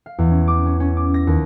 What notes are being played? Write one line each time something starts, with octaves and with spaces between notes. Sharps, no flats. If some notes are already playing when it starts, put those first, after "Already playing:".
F5
E2
C#4
D6
C#4
C#4
D6
A#6
D#2